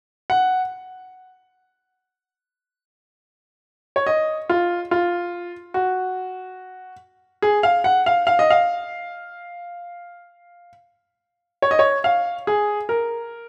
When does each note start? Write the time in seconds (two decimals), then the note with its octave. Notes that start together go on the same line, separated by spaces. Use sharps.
0.30 F#5
3.96 C#5
4.06 D#5
4.49 F4
4.91 F4
5.74 F#4
7.42 G#4
7.63 F5
7.84 F#5
8.06 F5
8.27 F5
8.39 D#5
8.50 F5
11.62 C#5
11.71 D#5
11.79 C#5
12.04 F5
12.47 G#4
12.89 A#4